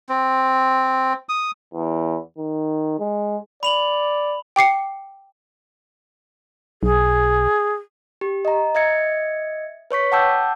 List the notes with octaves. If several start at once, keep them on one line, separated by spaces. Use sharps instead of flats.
C4
D#6
E2
D#3
G#3
D5 B5 F7 F#7
G5 D6 C7 C#7
B1 G#4
G4
D#5 A#5
D#5 E5 G#6 C#7
B4 C#5 C#6 B6
F#5 G5 A5 D6 E6 G6